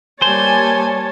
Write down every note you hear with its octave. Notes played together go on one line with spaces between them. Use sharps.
G3 A#3 C5 C#5 G#5 A5